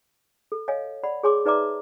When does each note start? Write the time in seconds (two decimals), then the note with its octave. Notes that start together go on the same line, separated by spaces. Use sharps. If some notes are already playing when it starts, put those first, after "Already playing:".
0.52 A4
0.68 C#5 D#5 F5 G#5
1.03 D5 F#5 B5
1.23 G#4 C#5 G#5 C6 D6
1.45 D#4 B4 D5 E5 A#5 D6